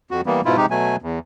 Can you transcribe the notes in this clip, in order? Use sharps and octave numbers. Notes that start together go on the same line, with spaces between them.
F2 F#4
E3 G3 A#3 B3
G#2 B2 E4 F4
C3 G#3 D#4 G4
B2 F#3 A3 G#5
E2